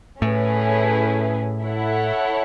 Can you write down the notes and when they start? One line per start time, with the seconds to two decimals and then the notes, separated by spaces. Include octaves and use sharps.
0.22 A2 A3 C#4 E4 G#4 B4
1.62 E4 A4 C#5 F#5